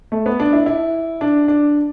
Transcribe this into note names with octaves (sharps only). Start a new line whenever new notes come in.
A3
B3
D4
E4
E4
D4
D4